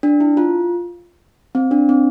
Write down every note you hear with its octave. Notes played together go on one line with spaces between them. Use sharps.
D4
E4
F4
C4
D4
C4